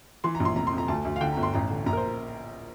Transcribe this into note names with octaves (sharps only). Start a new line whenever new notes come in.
E3 C6
A#5
A#1 C6
F1 A#5
C6
F2
A#5
D2 A5
D2
F5
D3 G5
G1 A#5
C6
A1 A#5
D3
A#1 A#5
A#4
C5